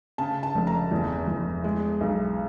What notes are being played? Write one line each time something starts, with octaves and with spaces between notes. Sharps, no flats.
C#3 A5
A5
F1
A#5
E2
E2
G#3
B1